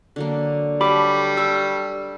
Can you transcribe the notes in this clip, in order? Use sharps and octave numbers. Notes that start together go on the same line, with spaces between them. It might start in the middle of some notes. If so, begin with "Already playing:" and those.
D3 F#3 A#3
F#3 G3 A4 B5 D6
D4 A4 C#6 E6